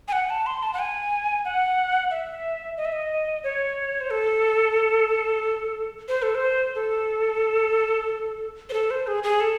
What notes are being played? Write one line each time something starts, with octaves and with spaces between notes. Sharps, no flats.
G#5
F#5
A5
C6
A5
F#5
G#5
F#5
E5
D#5
E5
D#5
C#5
C5
A4
C5
A4
C5
A4
C5
A4
C5
G#4
G#4
A4